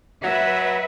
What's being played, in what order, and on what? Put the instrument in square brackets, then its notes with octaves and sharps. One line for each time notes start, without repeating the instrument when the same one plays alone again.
[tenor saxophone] F#3 [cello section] B4 E5